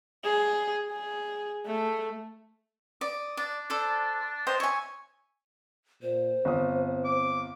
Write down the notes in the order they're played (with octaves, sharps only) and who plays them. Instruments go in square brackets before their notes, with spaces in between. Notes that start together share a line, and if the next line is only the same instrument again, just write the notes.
[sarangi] G#4
G#4
A3
[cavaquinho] D5 [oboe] D#6
[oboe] D4 [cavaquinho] D5
[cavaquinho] A4 C5 D5
G4 C5 D#5
[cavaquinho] C#5 G#5 [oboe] E5
[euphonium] A#2 [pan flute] C5
[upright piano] G1 D#6 [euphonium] C4
[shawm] D6